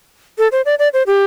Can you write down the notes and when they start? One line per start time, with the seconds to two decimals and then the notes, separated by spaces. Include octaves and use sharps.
0.38 A4
0.52 C5
0.65 D5
0.79 D5
0.93 C5
1.07 G4